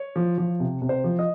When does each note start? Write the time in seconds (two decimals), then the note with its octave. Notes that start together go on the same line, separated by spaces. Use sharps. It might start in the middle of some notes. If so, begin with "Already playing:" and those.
Already playing: C#5
0.16 F3
0.38 F3
0.60 C3
0.82 C3
0.89 C5
1.04 F3
1.19 D#5